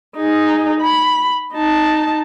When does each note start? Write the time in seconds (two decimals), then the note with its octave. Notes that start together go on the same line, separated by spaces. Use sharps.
0.16 D#4 G#4
0.81 B5
1.54 D#4 A5